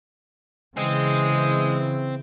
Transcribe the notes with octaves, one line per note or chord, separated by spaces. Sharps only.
C#3 E3 G#3 C4